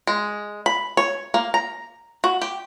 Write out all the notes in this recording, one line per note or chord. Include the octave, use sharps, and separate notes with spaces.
G#3
B5
C#5
A#3
A#5
F#4
G4